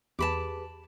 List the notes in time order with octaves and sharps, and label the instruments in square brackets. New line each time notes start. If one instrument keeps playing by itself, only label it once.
[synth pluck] E2 [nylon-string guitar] G4 G#4 B4 [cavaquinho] A5 B5 D6